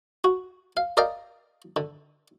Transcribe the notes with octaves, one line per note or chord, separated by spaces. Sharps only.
F#4
F5
A#4 D5 D#5 F5 G5 A#5
D3